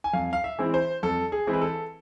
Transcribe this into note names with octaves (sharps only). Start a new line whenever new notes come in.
G#5
F2 F5
F5
E5
E3 G#3 C4 E4
C5
F2 A4
G#4
E3 G#3 C4 E4
B4
A4